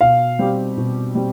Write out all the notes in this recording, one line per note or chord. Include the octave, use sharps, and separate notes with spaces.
B2 F5
G3 C4 G4
B2
G3 C4